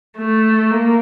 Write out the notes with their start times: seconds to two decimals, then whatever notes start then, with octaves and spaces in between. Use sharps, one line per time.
0.18 A3
0.71 A#3